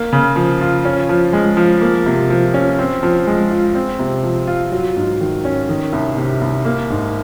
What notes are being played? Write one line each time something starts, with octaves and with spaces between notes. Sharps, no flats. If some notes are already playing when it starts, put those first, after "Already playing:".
Already playing: A#3
C#3
F3
F4
C#4
F3
G#3
F3
A#3
C3
F3
C#4
C4
F3
G#3
F4
C4
C3
F3
F4
F#3
G#2
D#3
C#4
D#3
C2
C3
C2
A#3
G#2